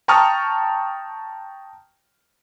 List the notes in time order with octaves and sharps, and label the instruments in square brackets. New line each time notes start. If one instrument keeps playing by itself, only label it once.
[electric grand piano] G5 A5 A#5 C#6 D#6 F6